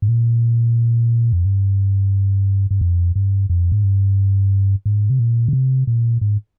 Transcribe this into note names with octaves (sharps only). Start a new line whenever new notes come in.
G#2
A#2
F2
G2
G2
F2
G2
F2
G#2
G2
G#2
C3
A#2
C#3
C3
A#2
G#2